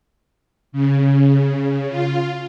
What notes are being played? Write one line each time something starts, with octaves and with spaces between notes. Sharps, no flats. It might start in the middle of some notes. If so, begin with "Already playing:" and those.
C#3
F4